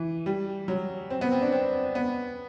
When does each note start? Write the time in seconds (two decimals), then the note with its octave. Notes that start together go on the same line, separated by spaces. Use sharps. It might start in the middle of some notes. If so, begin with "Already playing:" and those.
Already playing: E3
0.26 G3
0.68 F#3
1.10 C4
1.21 B3
1.32 C4
1.42 D4
1.52 C4
1.95 B3